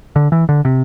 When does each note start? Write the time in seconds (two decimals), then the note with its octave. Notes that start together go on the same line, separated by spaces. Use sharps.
0.16 D3
0.32 E3
0.49 D3
0.65 C3